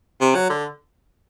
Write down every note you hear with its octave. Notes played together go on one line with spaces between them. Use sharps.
C3
F#3
D3